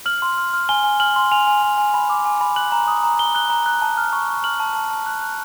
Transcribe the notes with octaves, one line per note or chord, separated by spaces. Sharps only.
F6 F#7
C6
F6
F6
G#5 G7
G#5
F6 F#7
C6
G#5 F7
G#5
G#5
G#5
B5
D6
G#5
B5
F#6 F#7
A#5
D#6
A#5
A#5 G7
F#6 G7
A#5
F#6
A5
F6
C#6
C#6
F6 F#7
A5
A5
A5
F#6
F#6